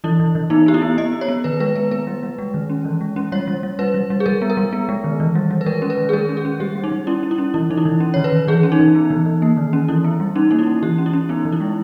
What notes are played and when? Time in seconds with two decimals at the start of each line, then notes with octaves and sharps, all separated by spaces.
0.04 E3 E4
0.19 E3
0.35 E3
0.50 B3 D#4
0.66 B3 G4
0.74 E4
0.82 B3
0.98 B3 D#5
1.13 B3
1.21 C#5
1.28 B3
1.44 D#3 B4
1.60 G#3 B4
1.75 B3 B4
1.91 B3 B4
2.07 G3
2.23 G3
2.38 G#3
2.54 D#3
2.70 C#4
2.85 E3
3.01 G#3
3.16 C#4
3.32 G3 C#5
3.48 G3
3.63 G3
3.79 G3 B4
3.94 G3
4.10 G3
4.20 G#4
4.26 G3 A#4
4.42 B3
4.50 A#4
4.57 G3
4.73 B3
4.89 G#3
5.04 D#3
5.20 E3
5.35 G3
5.51 G3
5.61 B4
5.66 G#3 A#4
5.82 C#4
5.90 B4
5.98 D#3
6.09 G#4
6.13 G#3 A#4
6.29 C#4
6.37 G#4
6.45 C#4
6.60 G3 G4
6.76 G3
6.84 D#4
6.92 G3
7.07 C#4 E4
7.23 C#4
7.31 E4
7.38 C#4
7.54 E3 E4
7.70 E3 D#4
7.78 E4
7.85 E3
8.00 C#4
8.14 D#3 C#5
8.24 B4
8.32 D#3
8.48 E3 G#4
8.63 C#4
8.72 D#4
8.80 E3
8.95 B3
9.10 E3
9.26 E3
9.42 A#3
9.57 D#3
9.73 C#4
9.88 E3 E4
10.04 B3
10.20 G3
10.36 C#4 D#4
10.51 A#3 D#4
10.59 E4
10.67 C#4
10.83 E3 G4
10.98 C#4
11.06 E4
11.13 C#4
11.29 B3 D#4
11.45 E3
11.52 E4
11.60 G#3